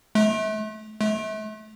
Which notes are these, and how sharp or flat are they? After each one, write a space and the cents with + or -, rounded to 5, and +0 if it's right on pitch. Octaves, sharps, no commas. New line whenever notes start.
A3 -35
A3 -35